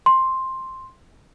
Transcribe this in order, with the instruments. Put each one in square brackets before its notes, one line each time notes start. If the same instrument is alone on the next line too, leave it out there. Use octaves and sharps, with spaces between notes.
[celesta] C6